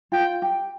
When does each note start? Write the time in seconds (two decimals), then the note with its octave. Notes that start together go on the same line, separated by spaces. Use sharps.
0.12 F4 G5
0.42 G4